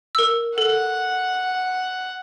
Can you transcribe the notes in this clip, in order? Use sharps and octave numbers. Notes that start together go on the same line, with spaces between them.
A#4 E6
A4 F#5